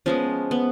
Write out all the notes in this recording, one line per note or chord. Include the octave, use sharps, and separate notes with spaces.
F3 G#3 B3 C#4
B3